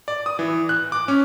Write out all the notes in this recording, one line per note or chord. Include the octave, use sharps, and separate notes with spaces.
D5
D#6
E3
F#6
D6
C#4